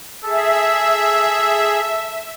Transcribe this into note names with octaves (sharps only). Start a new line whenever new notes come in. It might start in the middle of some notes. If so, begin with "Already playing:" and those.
G#4 A4 E5